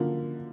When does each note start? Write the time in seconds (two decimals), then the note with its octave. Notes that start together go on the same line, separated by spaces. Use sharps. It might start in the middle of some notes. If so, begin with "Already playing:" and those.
Already playing: D3 F3 A#3